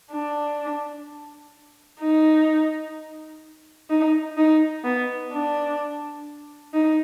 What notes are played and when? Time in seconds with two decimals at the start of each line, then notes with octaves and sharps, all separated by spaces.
0.11 D4
2.01 D#4
3.90 D#4
4.37 D#4
4.84 B3
5.31 D4
6.73 D#4